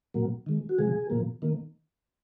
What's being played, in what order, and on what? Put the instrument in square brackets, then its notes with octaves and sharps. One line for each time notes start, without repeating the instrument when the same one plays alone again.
[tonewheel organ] A#2 F#3 A#3
D#3 G#3
F#4
C3 F3 G#3 G#4
A#2 F3 A#3
D#3 A#3